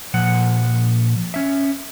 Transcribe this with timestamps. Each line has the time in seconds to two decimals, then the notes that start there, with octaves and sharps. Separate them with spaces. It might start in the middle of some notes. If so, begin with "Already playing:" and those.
0.14 A#2 F3 F#5
1.34 C#4 E5